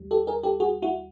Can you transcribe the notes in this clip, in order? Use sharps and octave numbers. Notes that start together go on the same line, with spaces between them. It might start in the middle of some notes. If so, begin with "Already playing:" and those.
Already playing: D#2 G3
G4 A4
G#4 A#4
G4 A4
F#4 G#4
E4 F#4